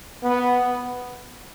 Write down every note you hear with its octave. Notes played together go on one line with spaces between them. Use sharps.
B3